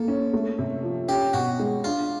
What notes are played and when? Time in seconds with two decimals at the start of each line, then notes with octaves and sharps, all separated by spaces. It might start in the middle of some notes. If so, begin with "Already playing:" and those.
Already playing: A#3 A4
0.08 C#4
0.33 A3
0.58 C3
0.83 F3
1.08 C#4 G4
1.33 B2 F#4
1.59 G#3
1.84 D4 F4